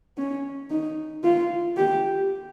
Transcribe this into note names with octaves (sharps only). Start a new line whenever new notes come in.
C#4
D#4
F4
G4